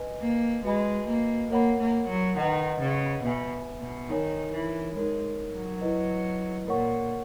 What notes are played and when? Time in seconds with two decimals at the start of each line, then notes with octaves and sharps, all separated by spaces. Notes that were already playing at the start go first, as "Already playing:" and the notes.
Already playing: B4 D#5 G#5
0.21 A#3
0.64 G#3 F#4 B4 D#5 G#5 B5
1.07 A#3
1.51 A#3 A#4 C#5 F#5 B5
1.79 A#3
2.08 F#3
2.37 D#3 B4 D#5 F#5
2.80 C#3
3.23 B2 B4 E5 G#5
3.80 B2
4.09 D#3 D#4 A#4 C#5 G#5
4.52 E3
4.96 G#3 D#4 A#4 C#5
5.53 F#3
5.81 E4 B4 D#5
6.68 A#2 A#4 C#5 F#5 C#6